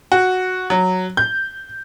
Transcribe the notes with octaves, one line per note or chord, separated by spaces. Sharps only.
F#4
F#3
G6